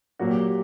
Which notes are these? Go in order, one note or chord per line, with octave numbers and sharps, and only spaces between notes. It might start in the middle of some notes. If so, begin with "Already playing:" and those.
A#2 F#3 A#3 F#4
G4